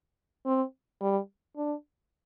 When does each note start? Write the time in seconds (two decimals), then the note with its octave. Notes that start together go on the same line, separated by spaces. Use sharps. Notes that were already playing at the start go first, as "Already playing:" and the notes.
0.46 C4
1.01 G3
1.57 D4